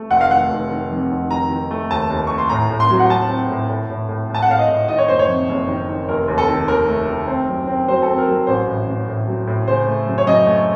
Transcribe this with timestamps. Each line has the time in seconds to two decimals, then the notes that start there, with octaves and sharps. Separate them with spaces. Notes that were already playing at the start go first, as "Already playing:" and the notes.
Already playing: A3
0.10 F1 F#5
0.21 F5
0.31 D#3 F#5
0.50 F1
0.70 D#3
0.91 F2
1.11 F1
1.30 D#3 A#5
1.50 D#3
1.71 A3
1.91 D#2 A5
2.10 D#2
2.27 A3 C#6
2.38 C6
2.49 A2 A#5
2.70 A2
2.80 C6
2.90 F#3
2.99 F#5
3.10 F#3 A5
3.29 C4
3.50 A2
3.69 A2
3.90 A2
4.09 A2
4.30 A2 A5
4.42 F#5
4.49 A2 F5
4.59 D#5
4.68 A2
4.88 D#3 D#5
4.98 C#5
5.08 F#1 C5
5.19 C#5
5.28 F2
5.49 F#1
5.69 D#3
5.89 D#3
6.09 F1 A#4
6.28 D#2
6.38 A4
6.48 D#3
6.68 D#2 A#4
6.88 A3
7.08 D#3
7.27 C4
7.48 F#2
7.67 C4
7.88 F#3 C5
8.02 A4
8.08 C4
8.18 A#4
8.28 F#3
8.47 A1 C5
8.67 A2
8.87 A1
9.08 A2
9.27 F#3
9.47 A2
9.68 C#3 C5
9.88 A3
10.07 F#2
10.18 C#5
10.27 F#2 D#5
10.46 A3